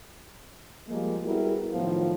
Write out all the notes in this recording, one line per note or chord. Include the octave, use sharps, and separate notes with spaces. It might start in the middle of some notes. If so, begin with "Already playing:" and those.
F3 G3 G#3 A#3
G3 B3 E4 F#4 G#4 A#4
A2 D#3 F3 F#3 B3 F4